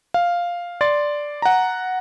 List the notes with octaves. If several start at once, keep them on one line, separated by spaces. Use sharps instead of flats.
F5
D5 C6 A6
F#5 A#5